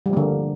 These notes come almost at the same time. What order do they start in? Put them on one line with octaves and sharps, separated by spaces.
G3 F3 A#3 D3